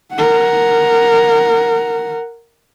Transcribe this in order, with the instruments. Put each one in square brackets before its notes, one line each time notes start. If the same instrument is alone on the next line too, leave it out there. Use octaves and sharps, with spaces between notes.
[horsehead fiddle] A#4 F#5